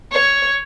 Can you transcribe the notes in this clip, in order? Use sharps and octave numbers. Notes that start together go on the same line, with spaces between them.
C#5